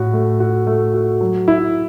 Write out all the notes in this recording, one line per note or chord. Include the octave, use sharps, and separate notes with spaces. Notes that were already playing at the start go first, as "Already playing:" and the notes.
Already playing: A2 F#4
A3
F#4
A3
F#4
F#3
E4